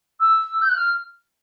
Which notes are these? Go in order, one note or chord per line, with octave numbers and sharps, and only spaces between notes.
E6
G6
F#6
F6